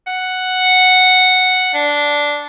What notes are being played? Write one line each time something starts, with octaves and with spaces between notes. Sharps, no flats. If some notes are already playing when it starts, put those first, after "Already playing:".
F#5
D4